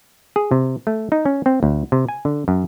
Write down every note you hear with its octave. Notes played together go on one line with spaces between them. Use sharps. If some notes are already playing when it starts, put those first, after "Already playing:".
G#4
C3
A3
D#4
C#4
C4
D2
C3
G#5
D3
F#2